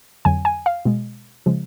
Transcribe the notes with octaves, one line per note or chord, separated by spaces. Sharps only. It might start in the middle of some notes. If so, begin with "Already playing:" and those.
F2 D3 F#3 G#5
G#5
F5
B2 G#3
C#3 F3 G#3